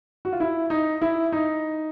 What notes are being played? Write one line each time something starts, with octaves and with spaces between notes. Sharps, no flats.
F#4
F4
E4
D#4
E4
D#4